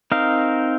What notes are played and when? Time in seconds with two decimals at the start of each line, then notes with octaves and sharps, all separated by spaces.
0.12 C4 D#4 A#4 F5